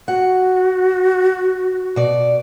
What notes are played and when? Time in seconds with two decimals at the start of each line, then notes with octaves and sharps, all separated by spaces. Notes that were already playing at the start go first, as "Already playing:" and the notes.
0.08 F#4 F#5
1.96 B2 D5